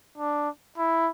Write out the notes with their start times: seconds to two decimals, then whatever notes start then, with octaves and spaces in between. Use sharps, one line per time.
0.18 D4
0.78 E4